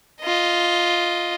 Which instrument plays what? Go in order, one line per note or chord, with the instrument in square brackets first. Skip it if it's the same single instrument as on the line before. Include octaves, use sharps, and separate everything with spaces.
[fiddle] F4 D#5